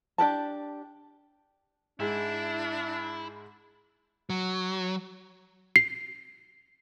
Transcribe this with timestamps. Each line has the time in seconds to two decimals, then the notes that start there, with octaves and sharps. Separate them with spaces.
0.18 D4 G4 A#4 A5
2.00 G#2 G#3 D4 E4
4.30 F#3
5.76 C7